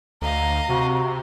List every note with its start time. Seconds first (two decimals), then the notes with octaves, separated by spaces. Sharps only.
0.22 D2 D#5 F5 A#5
0.69 C3 F#4